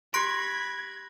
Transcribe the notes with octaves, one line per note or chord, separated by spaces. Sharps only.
G4 B5 C6 F#6 G#6 A#6 D7